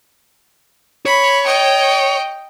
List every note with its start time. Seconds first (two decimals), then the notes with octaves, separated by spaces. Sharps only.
1.06 C#5 B5
1.45 D#5 G5